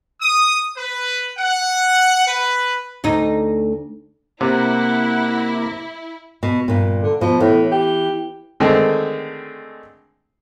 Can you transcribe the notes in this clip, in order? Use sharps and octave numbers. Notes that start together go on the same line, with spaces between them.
D#6
B4
F#5
B4
D2 D#4
C3 A#3 E4 F#5
B2
G2 A#2
D3
B2 F3
A2 E3
G4
D3 D#3 G#3 A3 C4